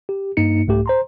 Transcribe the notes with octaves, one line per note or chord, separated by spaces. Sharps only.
G4
G2 A#3 D#4 C#7
C2 G#2 A3 G4
C5 A#5 C6